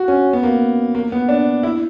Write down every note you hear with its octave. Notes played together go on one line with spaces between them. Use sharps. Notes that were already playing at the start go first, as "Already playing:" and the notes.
Already playing: F#4
C#4
B3
A#3
A#3
B3
D4
E4